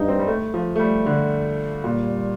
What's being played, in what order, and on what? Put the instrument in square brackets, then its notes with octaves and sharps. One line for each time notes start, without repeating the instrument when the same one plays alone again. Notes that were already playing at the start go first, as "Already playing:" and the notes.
Already playing: [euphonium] G2 [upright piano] D#4
[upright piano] C4
G3
A3
F3
A3
G3
D3
[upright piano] A#2 [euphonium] G3